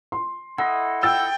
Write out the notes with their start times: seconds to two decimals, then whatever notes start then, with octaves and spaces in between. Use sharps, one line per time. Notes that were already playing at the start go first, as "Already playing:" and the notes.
0.12 C6
0.58 E4 A4 D#5 F#5
1.03 G5 E6 A6